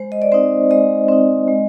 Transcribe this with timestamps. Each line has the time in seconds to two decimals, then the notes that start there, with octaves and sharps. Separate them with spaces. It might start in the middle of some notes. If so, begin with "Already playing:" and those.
Already playing: G#3 C5
0.12 D#5
0.22 D5
0.32 C4 D#4 C5
0.71 G#3 D#5
1.09 C4 D#4
1.48 G#3